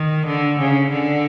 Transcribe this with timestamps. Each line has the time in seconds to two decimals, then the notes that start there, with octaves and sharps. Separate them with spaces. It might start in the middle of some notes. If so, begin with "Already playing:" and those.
Already playing: D#3
0.25 D3
0.59 C#3
0.90 D3